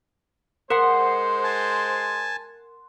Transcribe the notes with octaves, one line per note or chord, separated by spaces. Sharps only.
G#3 A#4 C5 F#5 C6
G#5 A5